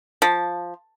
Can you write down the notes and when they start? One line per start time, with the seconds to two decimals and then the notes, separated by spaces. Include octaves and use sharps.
0.22 F3